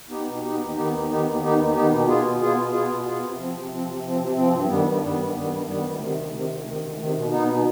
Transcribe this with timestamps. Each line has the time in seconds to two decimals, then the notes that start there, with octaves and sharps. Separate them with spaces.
0.10 B3 D#4 G4
0.26 B2
0.42 B3 D#4 G4
0.59 D#2
0.75 D#3 B3 D#4 G4
0.92 D#2
1.08 D#3 B3 D#4 G4
1.25 D#2
1.40 D#3 B3 D#4 G4
1.58 D#2
1.73 D#3 B3 D#4 G4
1.89 B2
2.07 B3 F4 G#4
2.23 B2
2.39 B3 F4 G#4
2.55 B2
2.72 B3 F4 G#4
2.88 B2
3.05 B3 F4 G#4
3.21 C3
3.37 F3 C4
3.54 C3
3.70 F3 C4
3.86 C3
4.04 F3 C4
4.19 C3
4.36 F3 C4
4.52 G2
4.68 D#3 G3 B3
4.85 G2
5.01 D#3 G3 B3
5.18 G2
5.34 D#3 G3 B3
5.50 G2
5.67 D#3 G3 B3
5.83 D2
6.00 C3 D#3
6.16 D2
6.33 C3 D#3
6.49 D2
6.65 C3 D#3
6.81 D2
6.98 C3 D#3
7.14 B2
7.30 B3 D#4
7.47 B2